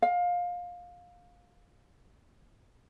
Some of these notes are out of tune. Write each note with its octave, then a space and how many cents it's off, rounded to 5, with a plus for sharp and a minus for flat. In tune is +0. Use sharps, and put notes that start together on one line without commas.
F5 +20